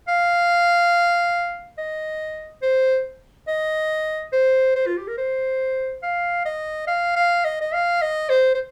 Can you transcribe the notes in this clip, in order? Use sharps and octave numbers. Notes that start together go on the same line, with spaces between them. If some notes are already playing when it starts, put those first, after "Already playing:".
F5
D#5
C5
D#5
C5
C5
F4
G4
A#4
C5
F5
D#5
F5
F5
D#5
D#5
F5
D#5
C5
C5